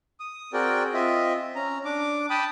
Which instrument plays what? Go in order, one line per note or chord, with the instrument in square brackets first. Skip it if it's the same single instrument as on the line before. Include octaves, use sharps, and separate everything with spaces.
[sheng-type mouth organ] D#6
C4 F#4 G#4 A#4 D5 G5
C4 F4 D#5 E5
C#4 A#5
D4 D6
G5 A5 B5 D#6